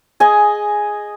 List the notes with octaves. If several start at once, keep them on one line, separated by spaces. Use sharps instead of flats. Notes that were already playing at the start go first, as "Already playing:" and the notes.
G#4 D#5 G#5